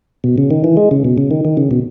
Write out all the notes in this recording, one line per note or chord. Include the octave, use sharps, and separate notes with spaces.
B2
C#3
D#3
E3
G#3
C#3
B2
C#3
D#3
D#3
C#3
B2